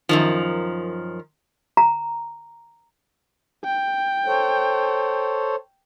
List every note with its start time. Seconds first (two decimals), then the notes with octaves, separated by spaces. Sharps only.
0.09 F#2 D#3 F3
1.77 A#5
3.65 G5
4.26 A4 C5 C#5